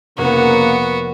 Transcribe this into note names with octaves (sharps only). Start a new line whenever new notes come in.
F1 C#3 A#3 B3 F#4 A#4 C#5